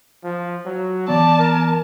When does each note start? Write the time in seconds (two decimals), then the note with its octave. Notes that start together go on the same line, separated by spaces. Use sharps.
0.24 F3
0.65 F#3
1.08 E3 B3 D5 A5
1.39 A#4